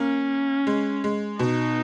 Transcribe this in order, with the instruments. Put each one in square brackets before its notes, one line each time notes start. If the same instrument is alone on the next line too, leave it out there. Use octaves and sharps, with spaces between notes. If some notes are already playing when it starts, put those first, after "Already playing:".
Already playing: [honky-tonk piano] A#3 [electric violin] C#4
[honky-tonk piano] G#3
G#3
[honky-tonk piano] B2 [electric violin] D#4